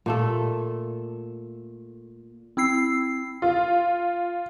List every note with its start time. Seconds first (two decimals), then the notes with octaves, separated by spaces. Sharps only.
0.06 A#2 A3 A4
2.57 C4 E4 E6 C7
3.42 F4